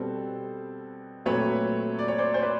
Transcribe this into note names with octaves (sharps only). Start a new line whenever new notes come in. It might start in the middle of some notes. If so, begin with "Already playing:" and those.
Already playing: B2 G3 C4 A4 B4
A#2 F#3 A3 C4 B4 C#5
D5
C#5
C5 D5
C5
B4